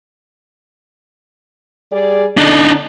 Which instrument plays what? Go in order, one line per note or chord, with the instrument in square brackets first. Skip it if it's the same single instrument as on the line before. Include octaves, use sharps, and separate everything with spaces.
[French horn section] G3 G#4 D5
[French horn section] D3 [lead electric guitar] D4 D#4